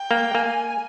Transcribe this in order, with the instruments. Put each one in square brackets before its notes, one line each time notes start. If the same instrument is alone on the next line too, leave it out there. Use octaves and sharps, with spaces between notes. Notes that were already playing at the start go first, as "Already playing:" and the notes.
Already playing: [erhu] G5
[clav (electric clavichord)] A#3
[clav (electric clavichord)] A#3 [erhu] G#5